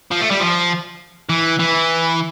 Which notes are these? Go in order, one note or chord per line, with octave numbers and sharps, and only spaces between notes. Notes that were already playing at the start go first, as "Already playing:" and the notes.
F3
A3
G3
F3
E3
E3